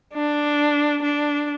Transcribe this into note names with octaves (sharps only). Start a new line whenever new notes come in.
D4
D4